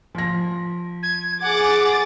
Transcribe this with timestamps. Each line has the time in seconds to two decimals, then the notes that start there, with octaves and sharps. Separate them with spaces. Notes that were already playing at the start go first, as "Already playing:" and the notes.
0.15 F3 A#6
1.03 G#6
1.42 G#4 F#5 D6 A6